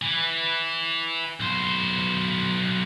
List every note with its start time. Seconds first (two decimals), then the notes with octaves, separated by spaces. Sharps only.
0.02 E3
1.40 B1 C5